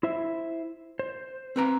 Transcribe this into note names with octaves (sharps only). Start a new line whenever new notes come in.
E4 C5 E5
C5
C4 B4 A#5